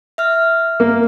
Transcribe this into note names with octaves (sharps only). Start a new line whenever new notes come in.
E5 F6
A#3